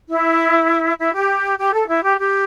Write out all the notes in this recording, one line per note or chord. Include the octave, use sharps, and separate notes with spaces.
E4
E4
G4
G4
A4
E4
G4
G4